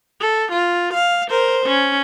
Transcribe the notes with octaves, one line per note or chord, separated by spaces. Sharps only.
A4
F4
F5
A#4 C5
C#4